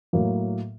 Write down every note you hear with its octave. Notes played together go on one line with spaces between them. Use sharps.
A2 F#3 A#3